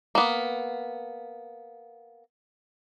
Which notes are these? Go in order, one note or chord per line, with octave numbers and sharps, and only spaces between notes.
A#3 B3